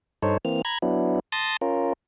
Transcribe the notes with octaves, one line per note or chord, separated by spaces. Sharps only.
G2 D#4 A4 C5 C#5
E3 A#3 C4 F6
A#5 B5 G#6
F#3 B3 D4 E4
A5 C6 D#6 A6 A#6
C#4 F4 A#4